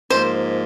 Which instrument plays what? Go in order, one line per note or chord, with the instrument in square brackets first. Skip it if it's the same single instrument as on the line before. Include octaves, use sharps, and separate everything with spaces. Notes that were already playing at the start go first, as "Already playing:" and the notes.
[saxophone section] G#2 F3 A#3 [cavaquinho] C5